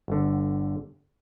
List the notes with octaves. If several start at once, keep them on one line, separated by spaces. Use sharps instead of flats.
G1 D3